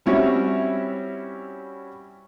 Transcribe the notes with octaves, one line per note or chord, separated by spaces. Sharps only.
G3 C4 C#4 E4 F#4 E5